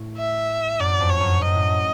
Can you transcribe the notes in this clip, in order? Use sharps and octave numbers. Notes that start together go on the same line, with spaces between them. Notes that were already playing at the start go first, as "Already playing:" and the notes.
Already playing: A2
E5
F#2 D5
F2
C#5
F#2
F#2 D#5
A2